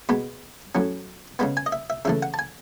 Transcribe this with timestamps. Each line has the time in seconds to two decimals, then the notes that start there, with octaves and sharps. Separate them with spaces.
0.09 B2 G#3 B3 B5
0.75 A2 F#3 C#4
1.39 C#3 G#3 B3 B5
1.57 G#5
1.66 D#5
1.72 E5
1.90 E5
2.05 C#3 E3 A3 E5
2.23 F#5
2.34 A5
2.39 G#5